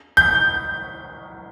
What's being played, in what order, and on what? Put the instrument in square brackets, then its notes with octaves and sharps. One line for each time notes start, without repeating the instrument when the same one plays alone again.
[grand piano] G6